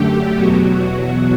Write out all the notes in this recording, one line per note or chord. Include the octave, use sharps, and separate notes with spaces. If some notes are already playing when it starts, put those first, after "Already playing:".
Already playing: F#2 D3 A3 G4
E2 B2 F#3 F#4